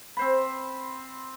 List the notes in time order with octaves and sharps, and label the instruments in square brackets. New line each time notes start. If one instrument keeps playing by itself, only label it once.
[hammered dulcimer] C4 C5 B5